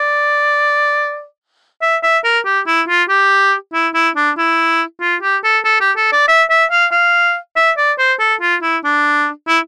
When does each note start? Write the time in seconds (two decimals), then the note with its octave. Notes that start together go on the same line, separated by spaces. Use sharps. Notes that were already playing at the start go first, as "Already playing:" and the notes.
Already playing: D5
1.82 E5
2.03 E5
2.24 A#4
2.45 G4
2.67 E4
2.88 F4
3.09 G4
3.73 E4
3.94 E4
4.16 D4
4.38 E4
5.01 F4
5.22 G4
5.44 A4
5.65 A4
5.80 G4
5.97 A4
6.12 D5
6.28 E5
6.50 E5
6.71 F5
6.92 F5
7.56 E5
7.77 D5
7.99 C5
8.20 A4
8.41 F4
8.63 E4
8.84 D4
9.48 E4